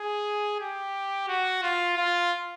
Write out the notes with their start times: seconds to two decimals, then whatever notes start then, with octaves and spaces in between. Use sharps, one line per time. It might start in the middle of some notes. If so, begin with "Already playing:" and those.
Already playing: G#4
0.60 G4
1.28 F#4
1.63 F4
1.97 F4